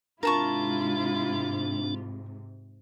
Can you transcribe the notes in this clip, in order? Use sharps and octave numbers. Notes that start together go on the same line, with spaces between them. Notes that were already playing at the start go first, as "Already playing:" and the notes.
G#2 C3 D4 E4 F4 A#4 A5 C#6